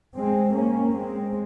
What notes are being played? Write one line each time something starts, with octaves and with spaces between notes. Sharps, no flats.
G#3 C4
A#3 C#4
G#3 C4